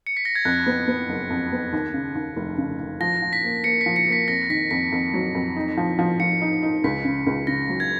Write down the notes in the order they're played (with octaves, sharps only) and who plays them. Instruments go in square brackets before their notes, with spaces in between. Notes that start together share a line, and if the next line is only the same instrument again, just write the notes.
[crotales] C#7
B6
A#6
G#6
[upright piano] F2 [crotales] F#6
[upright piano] B3
B3
F#1
F2
B3
D#2
C#3
D#2
F1
C#3
D#2
[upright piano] F3 [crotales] A#6
[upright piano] F3
[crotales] B6
[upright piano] A#3
[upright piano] A#3 [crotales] C#7
[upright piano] F3 [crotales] B6
[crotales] C#7
[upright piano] A#3 [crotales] B6
[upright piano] F2 [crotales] A#6
[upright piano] D#3 [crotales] B6
[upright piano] F2 [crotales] B6
[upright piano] F2
F#3
F2
D#4
F3
F3
[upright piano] F3 [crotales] C#7
[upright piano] D#4
D#4
[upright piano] C#2 [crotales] B6
[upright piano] C#3
C#2
[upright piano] C#3 [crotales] A#6
[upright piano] F#3
[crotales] G#6